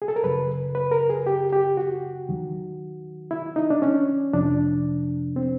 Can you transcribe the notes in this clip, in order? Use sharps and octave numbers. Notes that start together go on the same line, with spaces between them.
G#4
A4
A#4
F#2 C#3 F#3 B4
B4
A#4
G#4
G4
G4
F#4
D#2 D#3 F#3
E4
D#4
D4
C#4
F2 C3 F3 D4
C4